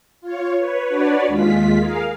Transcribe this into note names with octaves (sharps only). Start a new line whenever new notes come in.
F4 C#5
B4 C#5
D4 F#4 B4 C#5 D5
D#2 G#3 F4 B6
G#4 A#4 F5